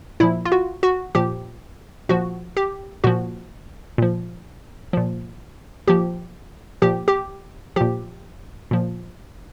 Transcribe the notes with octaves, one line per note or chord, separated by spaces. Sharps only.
A#2 F3 E4
F4
F#4
F#4
A#2 F3 G4
A#2 F3 F#4
G4
A#2 F3 F#4
A#2 F3
A#2 F3
A#2 F3 G4
A#2 F3 G4
G4
A#2 F3 G4
A#2 F3